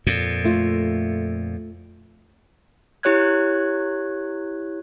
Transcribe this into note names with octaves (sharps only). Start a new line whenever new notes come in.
F2 A#2
A3 F4
E4 G4 C#5 F#6 G#6